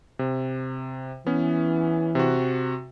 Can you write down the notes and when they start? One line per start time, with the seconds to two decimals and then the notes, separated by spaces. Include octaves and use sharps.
0.19 C3
1.26 E3 B3 C#4
2.15 C3 F#4